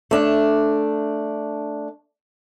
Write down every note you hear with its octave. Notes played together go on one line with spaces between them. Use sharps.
A3 D4